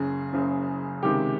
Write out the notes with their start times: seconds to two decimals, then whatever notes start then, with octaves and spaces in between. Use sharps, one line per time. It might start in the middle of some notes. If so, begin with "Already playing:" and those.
Already playing: F#1 F#2 C#3 G#4
0.33 F#1 F#2 C#3
1.03 C#2 C3 D#3 G#3 G4